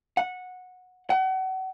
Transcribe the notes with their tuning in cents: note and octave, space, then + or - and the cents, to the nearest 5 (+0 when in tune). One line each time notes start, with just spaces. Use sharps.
F#5 -15
F#5 +35